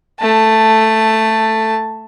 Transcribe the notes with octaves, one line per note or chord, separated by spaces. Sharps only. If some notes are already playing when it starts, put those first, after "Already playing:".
A3 A5